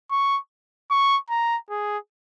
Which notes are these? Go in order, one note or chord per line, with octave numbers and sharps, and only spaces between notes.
C#6
C#6
A#5
G#4